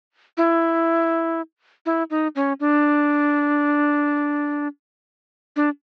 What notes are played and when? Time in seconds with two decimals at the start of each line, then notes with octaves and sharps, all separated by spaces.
0.37 E4
1.86 E4
2.10 D#4
2.36 C#4
2.60 D4
5.56 D4